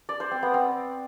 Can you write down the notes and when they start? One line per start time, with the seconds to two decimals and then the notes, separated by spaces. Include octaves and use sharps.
0.09 D5
0.20 C5
0.31 C4
0.43 B3
0.54 C4